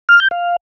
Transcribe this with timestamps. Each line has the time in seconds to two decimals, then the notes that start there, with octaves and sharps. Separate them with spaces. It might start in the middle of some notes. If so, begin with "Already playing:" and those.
0.09 F6
0.20 G6
0.31 F5